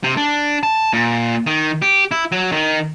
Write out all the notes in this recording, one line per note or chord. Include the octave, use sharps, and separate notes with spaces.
C3
D4
A5
A#2
D#3
G4
E4
F#3
D#3